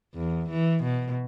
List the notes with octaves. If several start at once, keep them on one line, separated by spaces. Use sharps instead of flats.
E2
E3
B2